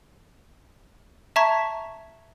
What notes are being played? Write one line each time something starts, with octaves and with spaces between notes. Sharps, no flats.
E5 A5 A#5 C#6 G#6 B6